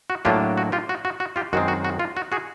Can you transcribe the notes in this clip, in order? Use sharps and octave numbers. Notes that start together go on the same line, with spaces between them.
F#4
A2 F#3 A#3 D4 F4 G4
F#4
F4 G4
F#4
F#4
F#4
F4 G4
F#2 D#3 G#3 C4 F#4
F#4
F#4
F4
F#4
F#4 G#4